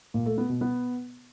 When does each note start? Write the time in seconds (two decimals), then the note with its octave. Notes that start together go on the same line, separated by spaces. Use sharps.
0.14 A#2
0.26 A3
0.38 B3
0.49 B2
0.61 B3